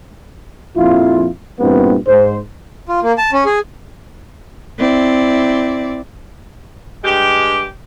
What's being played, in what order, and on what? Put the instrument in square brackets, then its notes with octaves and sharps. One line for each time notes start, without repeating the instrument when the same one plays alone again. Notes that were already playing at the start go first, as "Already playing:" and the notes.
[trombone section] A#1 F2 E4 F4
E2 G2 A#2 E3 B3 C4
G#2 C5
[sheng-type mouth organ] F4
A#3
A5
C#4
G#4
[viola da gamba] C4 E4 D5
[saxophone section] G2 G#3 G4